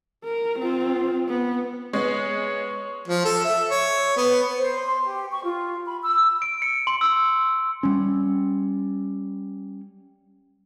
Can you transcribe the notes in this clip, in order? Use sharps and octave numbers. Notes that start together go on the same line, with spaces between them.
A#4
C4 F4
B3
G#3 B3 C#5
F3
A4
E5
C#5
B3
C5
C6
G4
C#6
F4
B5
E6
D7
C#7
C6
E6
G3 C#4